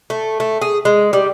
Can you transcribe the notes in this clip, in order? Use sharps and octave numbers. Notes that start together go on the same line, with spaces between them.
A3
A3
G#4
G#3
G3